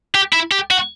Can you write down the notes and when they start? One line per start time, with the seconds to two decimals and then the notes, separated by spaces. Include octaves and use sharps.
0.15 G4
0.33 E4
0.52 G4
0.71 F#4